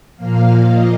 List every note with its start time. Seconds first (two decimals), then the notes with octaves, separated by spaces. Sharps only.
0.17 A#2 F3 A#3 F5
0.66 D#5